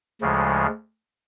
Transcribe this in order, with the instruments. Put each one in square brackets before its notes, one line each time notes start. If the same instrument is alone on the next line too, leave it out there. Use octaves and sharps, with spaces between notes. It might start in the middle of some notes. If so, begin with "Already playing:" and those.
[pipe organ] D2 C#3 F3 G#3